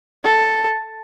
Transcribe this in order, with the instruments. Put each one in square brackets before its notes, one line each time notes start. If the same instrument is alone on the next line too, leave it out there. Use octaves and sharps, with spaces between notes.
[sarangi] A4